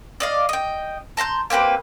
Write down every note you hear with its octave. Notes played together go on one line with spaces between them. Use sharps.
D5 D#5 F5
D#5 G5
A5 A#5 C6 G6
A#3 C4 G4 B4